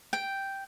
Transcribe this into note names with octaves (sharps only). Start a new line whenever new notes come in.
G5